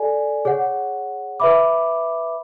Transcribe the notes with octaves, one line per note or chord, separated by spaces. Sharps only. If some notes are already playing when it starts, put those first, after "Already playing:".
Already playing: A4 D5 G#5
G#4 C#5 F#5
B4 E5 B5 D6